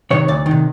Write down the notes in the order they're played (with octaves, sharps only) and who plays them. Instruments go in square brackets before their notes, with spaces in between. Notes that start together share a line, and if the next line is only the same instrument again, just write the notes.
[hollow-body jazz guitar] C3 D#3 C#5
D2 D5
D#3
C3